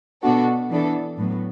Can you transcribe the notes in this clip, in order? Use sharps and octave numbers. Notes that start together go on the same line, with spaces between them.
B2 B3 D4 F#4 A4
E3 B3 D4 A4
A2 F#3 B3